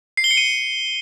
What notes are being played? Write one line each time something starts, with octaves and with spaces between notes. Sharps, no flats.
C7
G7
C#7
D#7